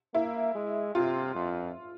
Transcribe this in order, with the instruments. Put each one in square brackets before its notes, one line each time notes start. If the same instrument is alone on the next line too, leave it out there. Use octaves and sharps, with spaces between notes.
[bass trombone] A#3 [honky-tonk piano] E4
[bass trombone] G#3
[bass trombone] C3 [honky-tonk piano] F4
[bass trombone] F2